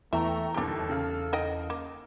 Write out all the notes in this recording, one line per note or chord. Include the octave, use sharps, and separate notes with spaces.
E2 E3 A3 E5 G5 A#5 C#6
G1 D#2 D4 G4 A4
C#3 F5 F6
D#4 D#5 G5
A#3